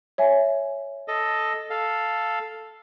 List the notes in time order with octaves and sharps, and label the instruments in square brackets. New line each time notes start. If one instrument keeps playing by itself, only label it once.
[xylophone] C#5 E5 G#5
[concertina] A4 D#5
A4 F5